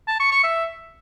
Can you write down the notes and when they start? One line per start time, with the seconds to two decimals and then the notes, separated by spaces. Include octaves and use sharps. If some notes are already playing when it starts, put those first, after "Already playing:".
0.08 A5
0.20 C#6
0.32 C#6
0.44 E5